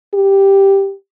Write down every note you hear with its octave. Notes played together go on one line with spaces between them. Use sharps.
G4